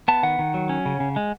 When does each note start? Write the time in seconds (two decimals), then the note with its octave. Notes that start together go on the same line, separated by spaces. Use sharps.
0.08 B3 A5
0.23 D#3 F#5
0.39 D#3
0.54 F#3
0.69 C#4
0.86 C#3
1.00 C#3
1.16 G#3